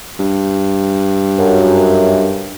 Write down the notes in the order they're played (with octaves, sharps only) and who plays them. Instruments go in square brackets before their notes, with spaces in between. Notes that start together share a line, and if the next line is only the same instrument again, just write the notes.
[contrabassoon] G2
[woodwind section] F#2